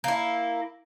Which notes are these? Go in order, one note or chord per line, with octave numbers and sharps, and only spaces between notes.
A#3 E4